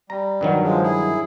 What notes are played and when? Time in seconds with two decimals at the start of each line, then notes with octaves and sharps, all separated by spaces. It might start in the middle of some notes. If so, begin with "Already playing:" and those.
0.10 G3 A#5
0.41 G2 D#3 F#3
0.63 F3 G#3
0.83 E4 G#4